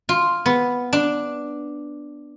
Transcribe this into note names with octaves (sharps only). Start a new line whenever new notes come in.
F4
B3
D4